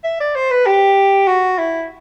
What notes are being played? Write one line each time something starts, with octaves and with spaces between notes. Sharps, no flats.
E5
D5
C5
B4
G4
F#4
E4